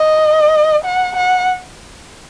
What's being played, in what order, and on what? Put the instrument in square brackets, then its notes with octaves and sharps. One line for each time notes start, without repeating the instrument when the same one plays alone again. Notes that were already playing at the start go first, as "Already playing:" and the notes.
Already playing: [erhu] D#5
F#5
F#5